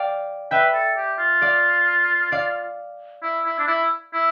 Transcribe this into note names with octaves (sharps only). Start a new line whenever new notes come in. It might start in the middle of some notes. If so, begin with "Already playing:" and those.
Already playing: D5 F5 G5
B4 E5 G5
A4
G4
F4
D5 F5
D5 F5
E4
E4
D4
E4
E4